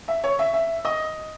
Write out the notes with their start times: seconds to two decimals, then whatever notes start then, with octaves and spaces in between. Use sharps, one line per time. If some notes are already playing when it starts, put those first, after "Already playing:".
0.08 E5
0.24 C#5
0.39 E5
0.53 E5
0.85 D#5